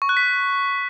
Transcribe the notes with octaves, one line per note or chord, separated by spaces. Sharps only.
C#6
F#6
B6